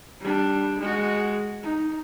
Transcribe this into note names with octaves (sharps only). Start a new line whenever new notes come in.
G3 D4
G#3 F#4
D#4